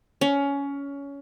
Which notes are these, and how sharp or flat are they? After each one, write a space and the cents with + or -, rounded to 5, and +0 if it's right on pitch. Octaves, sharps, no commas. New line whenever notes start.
C#4 +20